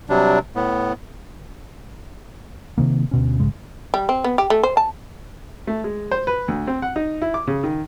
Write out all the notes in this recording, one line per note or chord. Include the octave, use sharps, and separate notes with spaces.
C3 F#3 G3 D4
A2 B3
C3 D#3 A#3
D2 B2 C#4
A#1 G#2 C#3 G#3
G3
C4
B3
G4
A3
C5
A5
A3
G#3
C5
B4
D2
C4
F#5
D#4
E4
D6
C#3
D#3